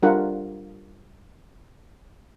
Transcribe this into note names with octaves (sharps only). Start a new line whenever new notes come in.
G3 D4 F4 A#4 F#5